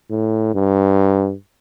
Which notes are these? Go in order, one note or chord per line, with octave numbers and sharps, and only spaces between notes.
A2
G2